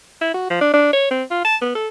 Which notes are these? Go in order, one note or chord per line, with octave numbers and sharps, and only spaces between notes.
E4
F#4
F3
D4
D4
C#5
C4
F4
A5
B3
A4